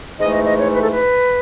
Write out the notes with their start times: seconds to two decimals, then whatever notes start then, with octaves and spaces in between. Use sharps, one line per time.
0.21 G#2 E3 A3 D#5
0.35 D#5
0.47 D#5
0.61 C#5
0.75 B4
0.83 A4
0.93 B4